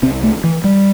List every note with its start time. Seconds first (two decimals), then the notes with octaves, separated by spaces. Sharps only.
0.02 C3 C4
0.06 C2
0.23 A3
0.44 E3
0.64 G3